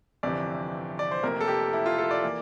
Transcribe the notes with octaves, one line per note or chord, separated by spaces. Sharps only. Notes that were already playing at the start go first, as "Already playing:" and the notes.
G1 F2 C3 E3 D5
D5
C5
F1 F2 C3 F3 A#3 A#4
A4
G4
E4
F4
A4
D5
E3 A#3